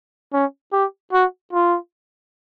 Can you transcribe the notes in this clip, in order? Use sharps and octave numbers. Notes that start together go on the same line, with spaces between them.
C#4
G4
F#4
F4